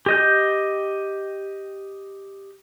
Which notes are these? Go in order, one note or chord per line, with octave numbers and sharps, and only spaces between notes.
G4 D#5 G6